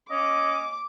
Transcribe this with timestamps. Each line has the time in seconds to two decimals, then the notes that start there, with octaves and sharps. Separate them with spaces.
0.10 C#4 D#5 F5 D6